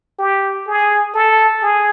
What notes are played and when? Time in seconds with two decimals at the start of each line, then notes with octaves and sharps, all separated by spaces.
0.19 G4
0.67 G#4
1.14 A4
1.62 G#4